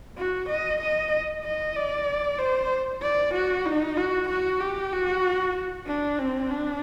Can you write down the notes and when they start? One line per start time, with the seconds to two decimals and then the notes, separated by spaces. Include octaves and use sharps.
0.18 F#4
0.49 D#5
0.81 D#5
1.45 D#5
1.76 D5
2.39 C5
3.02 D5
3.35 F#4
3.65 D#4
3.97 F#4
4.29 F#4
4.60 G4
4.93 F#4
5.87 D4
6.19 C4
6.51 D4